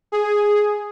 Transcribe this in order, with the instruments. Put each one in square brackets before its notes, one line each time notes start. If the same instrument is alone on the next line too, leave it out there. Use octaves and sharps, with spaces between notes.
[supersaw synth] G#4